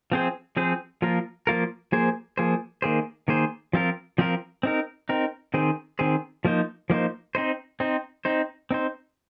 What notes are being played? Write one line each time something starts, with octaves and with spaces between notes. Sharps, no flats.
F3 C4 G#4 C5
F3 C4 G#4 C5
F3 A#3 F4 A#4
F3 A#3 F4 A#4
F3 A#3 G#4 C5
F3 A#3 G#4 C5
D#3 A#3 G#4 C5
D#3 A#3 G#4 C5
F3 C4 F4 A#4
F3 C4 F4 A#4
C4 D#4 A#4
C4 D#4 A#4
D#3 C4 G#4 C5
D#3 C4 G#4 C5
F3 A#3 D#4 C5
F3 A#3 D#4 C5
C4 D#4 C5
C4 D#4 C5
C4 D#4 C5
C4 D#4 C5